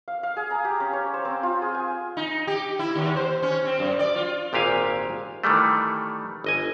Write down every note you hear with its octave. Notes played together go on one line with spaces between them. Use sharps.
F5
F5
G#4
A#5
G4
C#4
C#5
C5
C4
F4
G#4
G#5
D#4
G4
E4
D#2
C5
C#4
C4
F#2
D5
F4
G#1 A#2 G4 F5 G#5
D#3 E3 G3 A3
G1 D#5 G#5